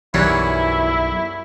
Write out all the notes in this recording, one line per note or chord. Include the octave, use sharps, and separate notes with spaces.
B1 F#2 E3 G3 C#4 E4